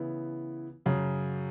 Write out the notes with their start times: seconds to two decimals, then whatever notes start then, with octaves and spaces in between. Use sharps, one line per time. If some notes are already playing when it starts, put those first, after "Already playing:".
Already playing: C#3 E3 B3 E4
0.86 F#2 C#3 F#3